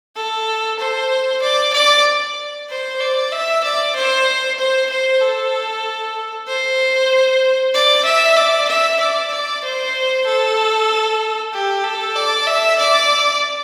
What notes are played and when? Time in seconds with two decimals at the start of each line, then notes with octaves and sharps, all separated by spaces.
0.16 A4
0.79 C5
1.42 D5
1.73 D5
2.69 C5
3.00 D5
3.32 E5
3.64 D5
3.95 C5
4.58 C5
4.90 C5
5.21 A4
6.47 C5
7.74 D5
8.05 E5
8.36 D5
8.68 E5
9.00 D5
9.32 D5
9.64 C5
10.26 A4
11.53 G4
11.84 A4
12.16 D5
12.47 E5
12.79 D5